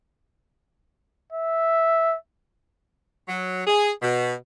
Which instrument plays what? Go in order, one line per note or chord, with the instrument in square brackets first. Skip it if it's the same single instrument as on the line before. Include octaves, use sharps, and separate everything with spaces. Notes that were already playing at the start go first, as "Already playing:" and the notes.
[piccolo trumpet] E5
[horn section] F#3
G#4
B2